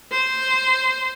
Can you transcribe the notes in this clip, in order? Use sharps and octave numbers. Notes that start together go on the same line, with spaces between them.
C5